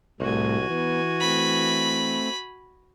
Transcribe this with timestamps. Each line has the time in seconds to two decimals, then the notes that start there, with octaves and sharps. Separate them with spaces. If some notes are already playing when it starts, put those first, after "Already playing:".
0.20 C2 A2 G3 A3 F#4 G#5
0.70 E3 B3
1.20 A3 C4 B5